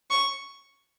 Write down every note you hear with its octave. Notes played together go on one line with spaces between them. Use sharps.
C#6